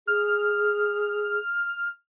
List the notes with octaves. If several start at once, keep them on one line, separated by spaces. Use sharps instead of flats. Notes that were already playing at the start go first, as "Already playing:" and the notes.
G#4 F6